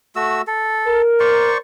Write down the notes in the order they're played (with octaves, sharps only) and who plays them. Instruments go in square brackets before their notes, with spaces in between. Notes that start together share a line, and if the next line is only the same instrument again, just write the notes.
[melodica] A3 F#4 E6
A4
[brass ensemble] A#4
[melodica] C5 D5 C#6